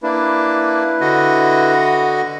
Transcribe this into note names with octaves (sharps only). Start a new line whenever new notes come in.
A#3 D4 E4 B4
D3 F#4 D#5